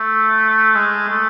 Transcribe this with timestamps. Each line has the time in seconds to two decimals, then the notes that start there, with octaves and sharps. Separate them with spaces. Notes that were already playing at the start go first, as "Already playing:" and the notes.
Already playing: A3
0.75 G#3
1.09 A3